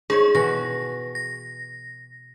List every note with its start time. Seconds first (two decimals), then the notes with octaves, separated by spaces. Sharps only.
0.10 D#4 G#4 C5 C#5 C#6
0.35 B2 E3 F#4 A#6
1.15 A#6